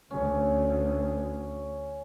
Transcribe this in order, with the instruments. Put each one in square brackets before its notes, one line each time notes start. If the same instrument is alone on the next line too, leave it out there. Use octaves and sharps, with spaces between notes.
[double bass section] D2 [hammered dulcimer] C#4